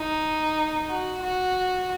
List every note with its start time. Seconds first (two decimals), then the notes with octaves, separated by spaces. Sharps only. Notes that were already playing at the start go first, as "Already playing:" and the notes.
Already playing: D#4
0.90 F#4
1.22 F#4